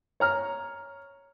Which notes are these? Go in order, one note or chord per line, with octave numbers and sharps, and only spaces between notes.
C#5 A#5 F6